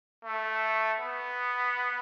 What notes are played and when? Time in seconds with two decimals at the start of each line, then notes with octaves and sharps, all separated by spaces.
0.24 A3
1.00 B3